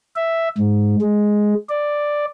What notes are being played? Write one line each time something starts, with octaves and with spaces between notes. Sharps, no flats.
E5
G#2
G#3
D5